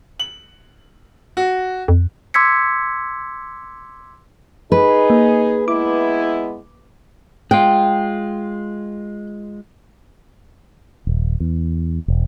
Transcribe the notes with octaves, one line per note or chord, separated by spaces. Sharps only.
F#7
F#4
F2
C6 D6 E6 G#6 B6 C#7
D#4 G#4 B4
A#3
G#3 B3 E4 D6
G#3 F4 G5
D#1
E2
E1